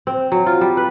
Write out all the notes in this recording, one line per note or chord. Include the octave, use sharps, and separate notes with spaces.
C4
F#3
F4
G3
B4